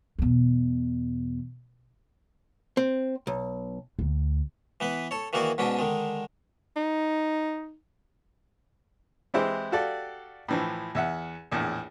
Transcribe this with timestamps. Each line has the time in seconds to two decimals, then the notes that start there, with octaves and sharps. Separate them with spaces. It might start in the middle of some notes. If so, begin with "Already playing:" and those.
0.19 E2 B2
2.77 C4
3.27 B1
3.99 D2
4.80 E3 B3 B4
5.11 A4 C#5
5.33 D#3 E3 A#3 F#4 G#4 D5
5.58 G#2 B2 C#4 D4 D#6
5.79 D3 D#3 G#3
6.76 D#4
9.34 E3 G#3 C4 E4 G4 C5
9.72 F#4 G4 A4 D5 F5
10.48 A2 E3 F3
10.95 E2 E5 F#5
11.52 A#1 E2 A2